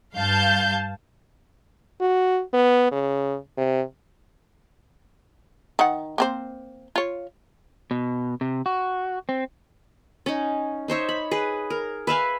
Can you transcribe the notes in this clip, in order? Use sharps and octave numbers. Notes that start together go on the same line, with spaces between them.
G2 F5 A5 G6
F#4
B3
C#3
C3
D#3 F#5
A#3 C4 C5
F4 C#5
B2
C3
F#4
C4
C#4 D#4
D#4 C5 C#5 E5
B5
G#4 B4
A#4
B4 E5 F5 G#5